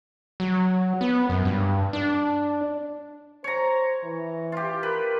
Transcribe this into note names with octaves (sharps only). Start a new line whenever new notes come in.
F#3
B3
F#2
G2
D4
C5 C#5 A#5
E3
F4 G4
A#4 B4